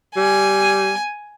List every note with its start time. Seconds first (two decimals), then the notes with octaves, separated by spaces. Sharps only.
0.16 G3 G#5